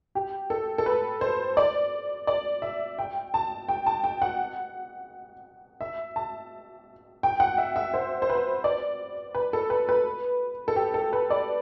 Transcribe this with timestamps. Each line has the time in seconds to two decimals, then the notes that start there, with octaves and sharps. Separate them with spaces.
0.15 G4
0.50 A4
0.78 A4
0.86 B4
1.21 C5
1.57 D5
2.27 D5
2.62 E5
2.99 G5
3.34 A5
3.68 G5
3.86 A5
4.04 G5
4.22 F#5
5.81 E5
6.16 A5
7.23 G5
7.40 F#5
7.58 E5
7.76 E5
7.94 C5
8.22 C5
8.30 B4
8.64 D5
9.35 B4
9.53 A4
9.70 B4
9.89 B4
10.68 A4
10.76 G4
10.94 A4
11.13 B4
11.30 D5